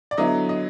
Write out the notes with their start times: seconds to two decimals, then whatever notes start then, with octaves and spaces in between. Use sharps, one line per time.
0.11 D5
0.18 D3 F#3 B3 E4 D#5
0.49 D#5